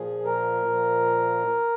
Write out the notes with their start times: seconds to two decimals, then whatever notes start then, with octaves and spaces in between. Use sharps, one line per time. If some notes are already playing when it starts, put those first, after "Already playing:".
Already playing: A#2 F3 G#4
0.25 A#4
0.65 A#2 F3